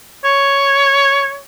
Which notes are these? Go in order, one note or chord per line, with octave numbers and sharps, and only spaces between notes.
C#5